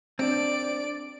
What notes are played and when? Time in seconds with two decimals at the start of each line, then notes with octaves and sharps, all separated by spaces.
0.19 C4 D4 D5 D7